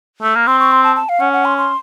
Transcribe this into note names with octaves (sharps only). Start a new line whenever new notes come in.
A3
A#3
C4 C6
C#6
C6
A5
A5
F5
C#4 F#5
F#5
C6
C6